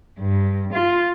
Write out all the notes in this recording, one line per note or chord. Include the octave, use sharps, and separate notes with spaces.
G2
F4